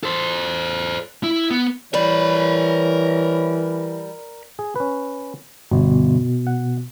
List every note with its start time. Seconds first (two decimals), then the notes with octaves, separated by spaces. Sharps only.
0.04 A4 C5
1.23 E4
1.51 B3
1.94 E3 G3 A#4 C#5 B5
4.59 G#4
4.76 C#4 B4
5.71 G1 B2
6.47 F#5